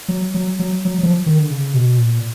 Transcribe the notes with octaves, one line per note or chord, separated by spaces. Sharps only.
F#3
F#3
F#3
F#3
F#3
F3
D#3
D3
C#3
B2
A#2